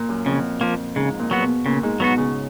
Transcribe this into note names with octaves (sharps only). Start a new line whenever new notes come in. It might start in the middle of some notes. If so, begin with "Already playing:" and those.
Already playing: A#2
F#2
F2 C#3
F3 A#3
G#2 C#3
A#2
F#3 B3 F#4
B2
A#2 C#3
G#2
B2 F#3 B3 F#4
C#3